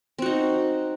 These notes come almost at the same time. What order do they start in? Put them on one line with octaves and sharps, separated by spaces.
C4 F#4 D#4